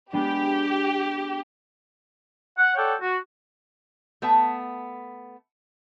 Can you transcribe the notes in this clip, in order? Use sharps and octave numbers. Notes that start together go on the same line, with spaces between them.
G#3 B3 D4 G4
F#5
A4 C#5 D5 F#5 G5
F#4
A3 B3 E5 A5